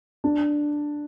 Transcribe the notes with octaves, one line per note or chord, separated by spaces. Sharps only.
D4